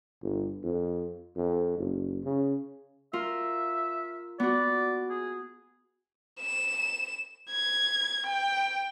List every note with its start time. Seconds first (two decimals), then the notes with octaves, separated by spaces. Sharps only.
0.22 G1
0.64 F2
1.36 F2
1.78 F#1
2.24 C#3
3.13 F4 A#4 E5
4.40 B3 F#4 D5
5.10 G#4
6.40 E7
7.50 G#6
8.27 G5